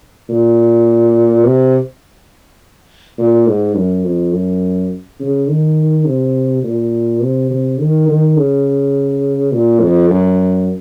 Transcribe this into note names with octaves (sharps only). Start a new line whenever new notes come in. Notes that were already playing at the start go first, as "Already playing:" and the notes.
A#2
C3
A#2
G#2
F#2
F2
F#2
C#3
D#3
C3
A#2
C3
C3
D#3
D#3
C#3
A#2
F2
F#2